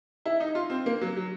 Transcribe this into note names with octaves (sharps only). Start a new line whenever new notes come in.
E4
D#4
F4
C4
A#3
F#3
F#3